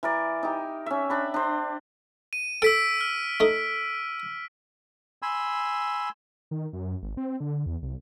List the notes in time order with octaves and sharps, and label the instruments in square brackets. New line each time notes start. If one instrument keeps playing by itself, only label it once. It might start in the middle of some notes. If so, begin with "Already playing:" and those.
[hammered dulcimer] E3 A#4 D5
D#4 G4
C#4 E5
D4 B5
D4 C5
[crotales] D#7
[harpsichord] A4 [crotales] E6 B6 D7
[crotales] F6
[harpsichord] A3 D#4
[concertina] G#5 B5 C6 E6
[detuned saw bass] D#3
F#2
G#1
C4
D3
E2
C2